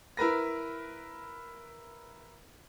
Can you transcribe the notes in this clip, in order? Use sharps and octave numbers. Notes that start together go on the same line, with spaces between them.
E4 A#4 B4 A#6